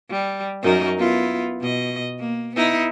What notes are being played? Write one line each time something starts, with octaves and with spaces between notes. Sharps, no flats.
G3
F#2 D#4 A#4
B3 E4 F4
B2 D#5
A#3
B3 D#4 E4